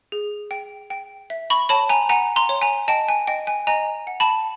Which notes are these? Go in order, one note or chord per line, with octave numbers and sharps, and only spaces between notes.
G#4
G5
G5
E5
B5 C#6
C#5 A5 B5
G#5 A#5
F#5 G#5 A#5
A#5 C6
C#5
G#5 A#5
D#5 G5 A5
G#5
D#5 G5
G#5
D#5 G#5 A#5
F#5
A5 B5